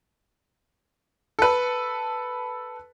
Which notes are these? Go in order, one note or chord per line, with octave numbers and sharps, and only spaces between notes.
A4 B4